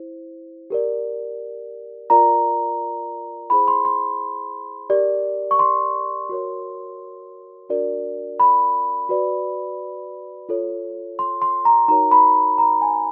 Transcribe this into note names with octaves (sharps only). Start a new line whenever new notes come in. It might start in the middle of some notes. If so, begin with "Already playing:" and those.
Already playing: E4 C5
G4 A#4 D5
F4 A#4 D5 A#5
E4 G#4 C5 B5
C6
C6
G4 A#4 D5
C#6
C6
F#4 A#4 C#5
D4 F#4 A#4 D5
B5
F#4 B4 D5
F4 A4 C#5
C6
C6
A#5
D#4 F#4 A#4 C#5 A#5
B5
A#5
G#5